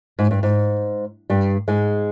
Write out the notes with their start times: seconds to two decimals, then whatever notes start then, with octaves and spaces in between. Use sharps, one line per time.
0.19 G#2
0.31 G2
0.43 G#2
1.30 G2 G3
1.68 G#2 G#3